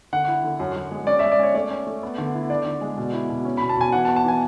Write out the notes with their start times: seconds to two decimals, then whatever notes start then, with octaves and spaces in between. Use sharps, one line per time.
0.13 D3 F#5
0.28 E4
0.44 D3
0.60 F#2
0.76 F#2
0.92 G#3
1.07 C#4 D5
1.19 G#3 E5
1.32 D5
1.39 C#4 C#5
1.54 A3 D5
1.70 C#4
1.87 A3
2.03 B3
2.18 D3
2.34 E4
2.50 D4 D5
2.66 D3
2.81 G#3
2.98 B2
3.13 E4
3.30 B2
3.45 C#4
3.57 B2 B5
3.69 A5
3.77 B2 G#5
3.92 E3 F#5
4.05 A5
4.08 B3
4.16 A5
4.24 E3 G#5